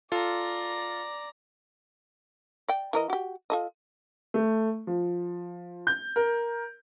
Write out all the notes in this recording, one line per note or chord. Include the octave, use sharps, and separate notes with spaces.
F4 A4 D5 A#5
D5 G5
E3 A#4 D#5
F#4 G4
F4 A4 D#5
A3
F3
G6
A#4